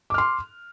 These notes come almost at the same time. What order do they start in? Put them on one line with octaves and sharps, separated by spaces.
D6 F6 C6